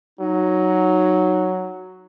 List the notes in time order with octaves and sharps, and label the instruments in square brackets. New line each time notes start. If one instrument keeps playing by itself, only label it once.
[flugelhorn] F#3 [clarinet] D#4